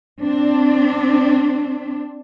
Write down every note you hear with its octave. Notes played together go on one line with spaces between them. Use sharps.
C4 D4